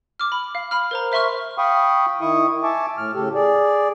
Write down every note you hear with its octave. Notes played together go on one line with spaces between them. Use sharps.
D6 F6
B5
F5
B5 F6
A#4 C5 A#5
C5 E5 C6 C#6 F6
F5 G5 B5 C#6 D#6
D#3 E4 C#6 D#6
E5 G#5 A5 C#6 D6
A2 F6
A2 C#3 G4 A4
G#4 D5